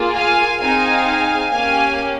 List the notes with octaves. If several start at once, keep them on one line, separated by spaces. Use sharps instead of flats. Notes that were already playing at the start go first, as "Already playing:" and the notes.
Already playing: A#3 F4 G#4
F5 G#5
C4 D#4 G#4 F5 G#5
A#3 C#4 G4 F5 G#5